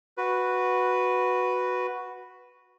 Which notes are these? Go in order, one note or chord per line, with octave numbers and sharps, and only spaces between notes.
F#4 B4